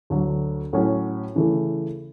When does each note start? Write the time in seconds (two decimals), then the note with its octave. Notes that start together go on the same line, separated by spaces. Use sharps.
0.10 D2 D3 F#3
0.73 A2 F#3 C#4 F#4
1.35 C#3 E3 A3